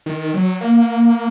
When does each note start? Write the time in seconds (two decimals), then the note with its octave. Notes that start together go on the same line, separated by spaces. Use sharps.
0.06 D#3
0.34 F#3
0.61 A#3